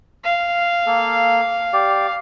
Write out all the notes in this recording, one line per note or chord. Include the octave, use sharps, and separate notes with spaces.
F5
A#3 A4
G4 D5